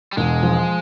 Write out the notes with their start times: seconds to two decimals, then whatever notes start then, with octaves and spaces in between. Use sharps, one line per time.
0.13 G3
0.17 E1 G#3
0.43 F3